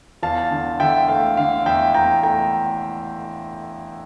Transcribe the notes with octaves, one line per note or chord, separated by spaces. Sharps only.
E2 F5 A5
D3
D3 E5 G5
A3 F5
D3 F5
E2 E5 G5
E2 G5 A#5
A3 G5 A#5